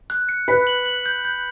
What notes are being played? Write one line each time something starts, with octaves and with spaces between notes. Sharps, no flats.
F#6
C#7
B4 B6
F#7
F#7
G6
G6